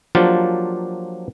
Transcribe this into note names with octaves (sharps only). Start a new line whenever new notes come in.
F3 F#3 A#3 D4 F4 G4